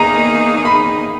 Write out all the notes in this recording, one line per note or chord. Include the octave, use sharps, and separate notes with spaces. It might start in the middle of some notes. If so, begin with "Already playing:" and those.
Already playing: E2 D#3 A#3 D#4 G#4 A#5
B5